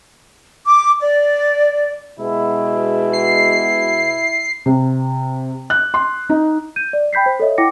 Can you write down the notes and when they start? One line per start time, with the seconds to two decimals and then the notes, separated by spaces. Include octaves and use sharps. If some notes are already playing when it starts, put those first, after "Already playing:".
0.65 D6
1.00 D5
2.19 B2 G#3 E4
3.13 C7
4.66 C3
5.70 F#6
5.94 C6
6.29 D#4
6.76 G6 D#7
6.93 D5
7.13 G5 B5 G6 B6 C7
7.26 C5
7.40 A4 C#5 D#5 E5
7.58 E4 F#5 G5 D6 A#6 C#7